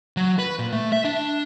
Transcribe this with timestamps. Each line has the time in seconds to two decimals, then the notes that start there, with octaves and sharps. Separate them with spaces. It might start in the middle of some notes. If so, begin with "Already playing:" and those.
0.17 F#3
0.39 B4
0.59 A#2
0.72 A3
0.92 E5
1.05 D4